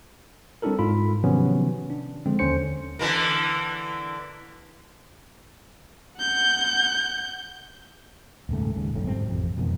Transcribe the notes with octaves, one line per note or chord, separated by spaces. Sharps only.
G3 C4 D4 E4 A4 A#4
G#2 F4 B5
C3 D#3 F3 F#3 B3 C#4
D4
D3 F3 G#3 C4
D#2 D3 C#4 C5 C#7
D3 E3 A#3
F#5 G6
D#1 G#2 C#3 A3
D#2 G#2 C#3
F#1 B1 A2 D3
G#2 G3 C4
A1 F2 C3
E1 F2 B2 D#3